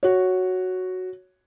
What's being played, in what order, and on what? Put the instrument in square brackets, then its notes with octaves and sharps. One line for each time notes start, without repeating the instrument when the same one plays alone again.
[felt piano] F#4 C#5